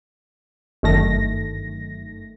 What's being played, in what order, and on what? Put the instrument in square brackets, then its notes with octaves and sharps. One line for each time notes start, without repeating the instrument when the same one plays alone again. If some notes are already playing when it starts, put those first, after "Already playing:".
[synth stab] G1 F#2 D#3 A3 A#6